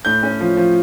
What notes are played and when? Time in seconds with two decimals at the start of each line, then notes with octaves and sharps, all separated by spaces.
0.05 A2 G6
0.23 C#4
0.40 F3
0.57 F3